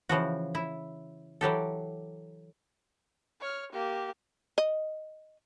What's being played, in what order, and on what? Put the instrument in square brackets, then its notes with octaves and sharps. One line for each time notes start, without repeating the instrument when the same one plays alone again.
[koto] C#3 E3 F3 F#4
E4
E3 F#3 G4 A4
[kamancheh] C#5 F6
A#3 G4
[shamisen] D#5